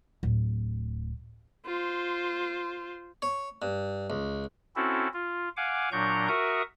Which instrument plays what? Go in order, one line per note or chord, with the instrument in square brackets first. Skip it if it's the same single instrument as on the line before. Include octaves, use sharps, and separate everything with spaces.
[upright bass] D1
[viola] F4 C5
[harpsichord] C#5
G2
C#2
[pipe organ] C4 C#4 E4 F#4 A4
F4
F5 F#5 G#5 D6
A#2 F#3 D4 A#5 C#6 G6
F#4 A#4 E5 C#6 D#6